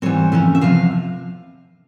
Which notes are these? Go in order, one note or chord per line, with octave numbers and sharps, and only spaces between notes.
G#2 E3 G3 C4 C#5
F2 C#3 E3 C#4 E5
E5
E2 C3 F3 F5